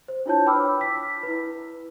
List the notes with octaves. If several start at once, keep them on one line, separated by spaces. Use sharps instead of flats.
C5
D4 E4 F4 C#5 A5 G6
B4 G5 B5 D6 E6 F6
B6
E4 B4